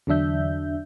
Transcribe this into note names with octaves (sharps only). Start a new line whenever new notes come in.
E2 D3 F#3 D4 E5 G6